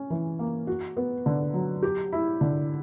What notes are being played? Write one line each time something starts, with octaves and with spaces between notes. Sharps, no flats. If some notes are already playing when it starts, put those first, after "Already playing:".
Already playing: C#4
E3
A#3
F#4
B3
D3
F#3
G4
E4
D3